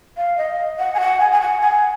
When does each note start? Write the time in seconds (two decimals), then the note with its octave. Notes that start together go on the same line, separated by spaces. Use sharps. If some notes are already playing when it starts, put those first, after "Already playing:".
0.17 F5
0.38 D#5
0.79 F#5
0.94 G#5
0.99 F#5
1.20 G#5
1.32 G#5
1.41 F#5
1.61 G#5